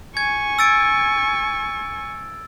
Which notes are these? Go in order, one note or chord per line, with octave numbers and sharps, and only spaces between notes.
G#5 C#6 G#6
E6 A6 D7